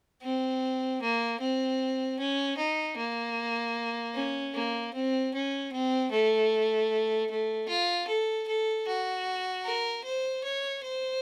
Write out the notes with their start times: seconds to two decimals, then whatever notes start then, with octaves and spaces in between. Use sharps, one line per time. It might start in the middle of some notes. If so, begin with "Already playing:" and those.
0.22 C4
1.01 A#3
1.40 C4
2.19 C#4
2.57 D#4
2.97 A#3
4.15 C#4
4.55 A#3
4.94 C4
5.34 C#4
5.72 C4
6.11 A3
7.30 A3
7.68 F4
8.08 A4
8.48 A4
8.87 F#4
9.65 A#4
10.04 C5
10.44 C#5
10.83 C5